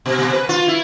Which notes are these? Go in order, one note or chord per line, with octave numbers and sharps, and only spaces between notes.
B2
B2
B4
F4
E4